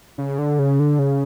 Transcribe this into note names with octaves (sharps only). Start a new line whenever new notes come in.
C#3
D3
C#3
D3
C#3